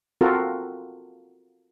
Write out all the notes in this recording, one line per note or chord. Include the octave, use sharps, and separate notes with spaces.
C4 F4 F#4 A4 A#4